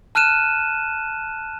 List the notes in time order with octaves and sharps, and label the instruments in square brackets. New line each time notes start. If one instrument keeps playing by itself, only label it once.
[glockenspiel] A5 F6 F#6 D#7 E7